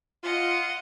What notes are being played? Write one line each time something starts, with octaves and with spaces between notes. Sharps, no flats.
F4 D#5 F#5